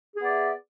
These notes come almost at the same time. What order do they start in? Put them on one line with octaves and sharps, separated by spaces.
G#4 B3 D5 E5